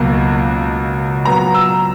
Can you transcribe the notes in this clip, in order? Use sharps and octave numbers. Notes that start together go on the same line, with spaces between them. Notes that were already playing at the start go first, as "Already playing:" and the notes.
Already playing: C#2 B2 F#3 A#3
A#2 F#3 B3 A#5
E6